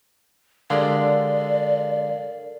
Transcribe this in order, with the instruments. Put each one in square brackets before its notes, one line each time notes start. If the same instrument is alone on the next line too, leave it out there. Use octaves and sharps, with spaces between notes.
[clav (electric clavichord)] D3 G#3 G4 [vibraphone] A4 A#4 [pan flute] D5 [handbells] F5